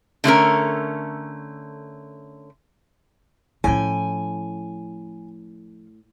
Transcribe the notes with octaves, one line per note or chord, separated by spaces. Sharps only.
D3 A3 C#4 A#4
A2 F3 C#4 G5 G#5